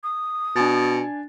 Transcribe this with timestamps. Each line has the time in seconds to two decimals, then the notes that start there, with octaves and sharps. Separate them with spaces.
0.03 D#6
0.56 B2 D4 G#5 A6